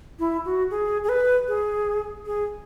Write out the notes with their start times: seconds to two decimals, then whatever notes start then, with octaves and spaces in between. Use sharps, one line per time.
0.19 E4
0.45 F#4
0.71 G#4
1.04 G#4
1.09 B4
1.48 G#4
2.26 G#4